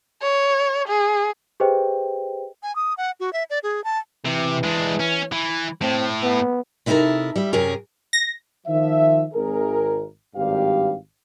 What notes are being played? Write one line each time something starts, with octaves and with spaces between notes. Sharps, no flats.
C#5
G#4
G4 G#4 B4 C5 D#5 G5
G#5
D#6
F#5
F#4
E5
D5
G#4
A5
C3 E3
G#3 D4
C#4
E3
A2 C4
B3
C3 D#4 E4 G4 A4 A#4
G3 E5
F#2 C3 C#4 G#4 A#4
A#6
D#3 F3 E5
G#1 G#4 A#4
G#1 G2 G4 F5